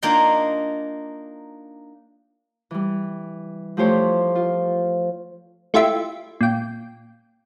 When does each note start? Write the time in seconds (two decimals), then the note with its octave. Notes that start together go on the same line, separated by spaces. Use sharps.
0.03 A#3 D4 D#4 F4 G5 C6
2.71 E3 G3
3.77 F3 A3 E4 G4 C5 C#5
4.35 F4
5.74 A3 E4 F4 G4 E5
6.41 A#2 G5